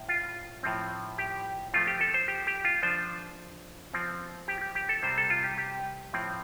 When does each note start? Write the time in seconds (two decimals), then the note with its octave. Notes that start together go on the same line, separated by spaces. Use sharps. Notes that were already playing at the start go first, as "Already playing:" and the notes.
Already playing: A2
0.09 F4
0.63 A2 F3 C4
1.18 G4
1.73 F3 A3 C4 F4
1.88 G4
2.01 A4
2.14 C5
2.28 G4
2.47 G4
2.65 F4
2.83 F3 D4 C5
3.93 F3 C4
4.48 G4
4.61 G4
4.75 G4
4.89 A4
5.03 C3 G3 C4 C5
5.18 A4
5.30 F4
5.44 G4
5.58 G4
6.13 A2 F3 C4